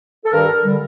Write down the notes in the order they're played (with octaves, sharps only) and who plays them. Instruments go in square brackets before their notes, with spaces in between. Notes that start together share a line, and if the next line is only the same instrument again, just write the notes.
[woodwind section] A4
G2 D#3 G3 A#4
D3 G3